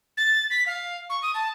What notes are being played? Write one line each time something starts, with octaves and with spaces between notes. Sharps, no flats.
A6
B6
F5
C#6
D#6
A5